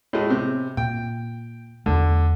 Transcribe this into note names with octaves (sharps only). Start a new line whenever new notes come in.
A2 G#3
C3
A#2 G5
E2 D3 A3